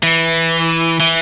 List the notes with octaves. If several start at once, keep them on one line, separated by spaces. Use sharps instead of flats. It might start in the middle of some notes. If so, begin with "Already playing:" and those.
E3
E3